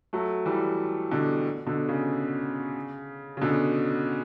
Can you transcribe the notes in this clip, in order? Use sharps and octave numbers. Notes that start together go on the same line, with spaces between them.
F#3 A3
E3 G3
B2 D3
B2 D3
C#3
C#3
B2 D3